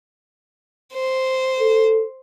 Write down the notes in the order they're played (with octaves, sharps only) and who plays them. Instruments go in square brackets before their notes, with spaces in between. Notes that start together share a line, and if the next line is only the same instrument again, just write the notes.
[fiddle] C5
[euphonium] A4